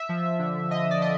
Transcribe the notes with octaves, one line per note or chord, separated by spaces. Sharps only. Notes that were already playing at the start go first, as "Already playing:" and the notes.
Already playing: E5
F3
D3
D3 D#5
D5
F3 D#5